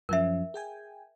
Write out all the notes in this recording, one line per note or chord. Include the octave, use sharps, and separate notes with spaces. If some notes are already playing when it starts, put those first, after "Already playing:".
F#2 F3 C#4 A#4 E5
G#4 G5 G#5